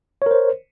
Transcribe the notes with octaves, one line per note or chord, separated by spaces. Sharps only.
A#4 C5 C#5